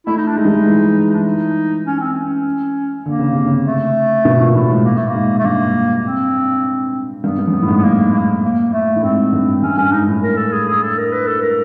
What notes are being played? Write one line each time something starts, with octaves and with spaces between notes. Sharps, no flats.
A3 E4
D#4
D4
G#3 D#4
G3
G#3
E3
D4
D#4
C#4
C4
C#4
D3 A#3
C#3
C3
C#3
A3
B2
A#2
A2
G#2
A#3
A3
A#3
G#2
A3
G2 A#3
C4
G2 B3
G2
F#2
G2
A2
G#2
B3
G2 A#3
A#3
A#3
A3
A2
G#2 C4
G2
G2 C#4
G2 C#4
G#2 D#4
A2
A#4
A4
G#4
G#4
A4
A#4
B4
A4
A#4